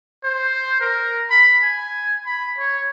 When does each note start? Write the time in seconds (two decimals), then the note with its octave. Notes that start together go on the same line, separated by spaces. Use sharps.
0.24 C5
0.80 A#4
1.30 B5
1.63 G#5
2.26 B5
2.58 C#5